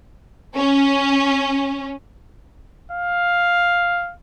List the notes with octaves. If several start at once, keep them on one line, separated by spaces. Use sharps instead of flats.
C#4
F5